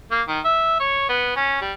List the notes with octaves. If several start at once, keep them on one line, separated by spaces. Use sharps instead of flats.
A#3
D#3
E5
C#5
B3
C#4
G3